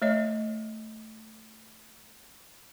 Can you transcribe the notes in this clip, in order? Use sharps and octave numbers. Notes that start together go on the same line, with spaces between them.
A3 C#5 D#5